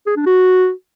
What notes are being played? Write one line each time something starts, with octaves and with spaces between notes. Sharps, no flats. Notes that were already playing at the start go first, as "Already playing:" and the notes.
G#4
D4
F#4